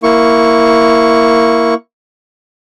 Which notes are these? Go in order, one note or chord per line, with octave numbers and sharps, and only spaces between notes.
A#3 E4 C#6